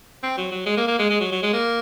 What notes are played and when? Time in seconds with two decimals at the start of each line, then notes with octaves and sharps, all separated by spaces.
0.23 C4
0.38 F#3
0.52 F#3
0.66 G#3
0.77 A#3
0.88 A#3
0.99 G#3
1.10 G#3
1.21 F#3
1.32 F#3
1.43 G#3
1.53 A#3